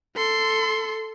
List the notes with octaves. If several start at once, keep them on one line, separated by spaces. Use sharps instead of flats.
A4 C6